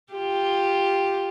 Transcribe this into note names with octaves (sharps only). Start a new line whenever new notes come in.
F4 G4